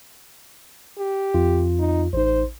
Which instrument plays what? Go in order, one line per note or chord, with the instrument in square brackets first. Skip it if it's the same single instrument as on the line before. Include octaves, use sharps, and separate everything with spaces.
[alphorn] G4
[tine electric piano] F2 F4
[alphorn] D#4
[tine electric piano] A1 D#4 [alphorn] C5